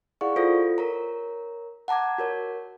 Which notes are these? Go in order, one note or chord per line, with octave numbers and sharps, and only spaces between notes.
E4 G#4 D5 F5 F#5 C#6
F4 A4 C5 D#6 A#6
A#4 C#5 A#5
F#5 A5 A#5 D6 G#6
F#4 A#4 C#5